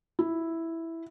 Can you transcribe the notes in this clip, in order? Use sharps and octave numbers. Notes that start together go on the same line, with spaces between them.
E4